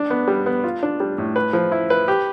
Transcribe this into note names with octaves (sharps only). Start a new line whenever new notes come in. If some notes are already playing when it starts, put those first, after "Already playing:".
Already playing: D4
B3
G3
B3
F4
D4
G3
A2
B4
F3
E4
B4
G4